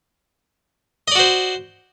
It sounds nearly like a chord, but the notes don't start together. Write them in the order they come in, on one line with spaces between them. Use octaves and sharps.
D#5 D5 F#4 C5